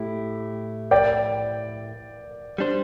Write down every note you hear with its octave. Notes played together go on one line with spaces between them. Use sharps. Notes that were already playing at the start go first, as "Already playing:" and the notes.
Already playing: A2 A3 E4 G4
D5 G5
G3 D4 C5